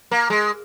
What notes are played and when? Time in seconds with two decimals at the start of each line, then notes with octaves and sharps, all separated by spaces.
0.11 A#3
0.30 G#3